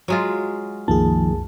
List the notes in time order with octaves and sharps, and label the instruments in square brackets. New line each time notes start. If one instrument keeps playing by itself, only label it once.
[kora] F#3 G#3 F4
[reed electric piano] C2 F#2 A5 [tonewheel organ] D#3 F3 [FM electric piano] A#3 G#4